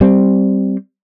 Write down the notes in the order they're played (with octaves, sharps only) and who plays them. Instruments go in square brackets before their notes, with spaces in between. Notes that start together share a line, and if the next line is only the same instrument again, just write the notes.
[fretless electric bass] G3 C4